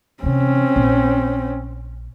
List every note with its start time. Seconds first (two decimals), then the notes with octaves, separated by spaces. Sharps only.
0.23 C3 E3 C4 C#4
0.76 A#1